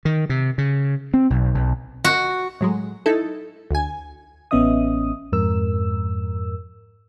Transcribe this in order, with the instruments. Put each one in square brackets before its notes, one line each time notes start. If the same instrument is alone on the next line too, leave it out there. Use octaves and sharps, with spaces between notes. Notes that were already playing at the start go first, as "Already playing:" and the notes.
[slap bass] D#3
C3
C#3
C4
B1
B1
[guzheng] F#4
[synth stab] A2 F#3 G#3
D#4 E4 A4
D2 G#5
[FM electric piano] A1 B3 C#4 D#5 E5 D#6
F2 G#2 A#4 E6